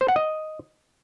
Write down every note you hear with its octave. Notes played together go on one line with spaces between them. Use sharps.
C5
F#5
D#5